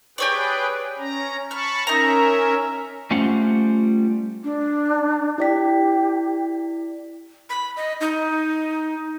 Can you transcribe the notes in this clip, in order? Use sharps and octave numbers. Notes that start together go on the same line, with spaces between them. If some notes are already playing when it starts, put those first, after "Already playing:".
G4 G#4 B4 C#5 D5 G5
C#4 A#5
A5 B5 C#6 F6
C#4 D#4 A#4 E5 A#5
G3 A3 C#4 F4 C5 F#5
D4
E4 G4 D5 B6
B5
D#5
D#4